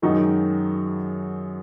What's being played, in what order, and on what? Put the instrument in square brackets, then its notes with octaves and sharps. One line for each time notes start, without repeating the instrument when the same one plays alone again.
[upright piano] F#2 D#3 G#3 D#4 F#4